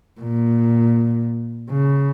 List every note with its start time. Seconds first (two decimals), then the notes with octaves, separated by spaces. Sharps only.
0.20 A#2
1.71 C#3